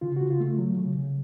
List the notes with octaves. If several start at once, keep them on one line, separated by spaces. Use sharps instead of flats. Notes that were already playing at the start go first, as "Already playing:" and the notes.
C#3 F4
C#3 F#4
F4
A3
F#3
C#3
C#3